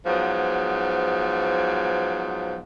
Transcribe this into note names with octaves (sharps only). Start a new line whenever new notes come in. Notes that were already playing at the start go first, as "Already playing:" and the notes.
G#2 F3 F#3 B3